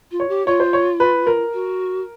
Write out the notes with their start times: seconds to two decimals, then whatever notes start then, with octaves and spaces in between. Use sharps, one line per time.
0.11 F4
0.20 C#5
0.29 G4
0.46 F4 C#5
0.60 C5
0.73 C#5
1.00 B4
1.27 A#4
1.53 F#4